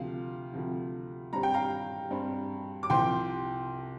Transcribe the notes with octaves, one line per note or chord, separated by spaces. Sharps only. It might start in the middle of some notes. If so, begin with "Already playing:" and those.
Already playing: D2 C3 F3 F5
D2 C3 F3
G2 G3 C4 A#5
G5
F5 A#5
G2 G3 C4
D6
C2 C3 F3 C4 G5 C6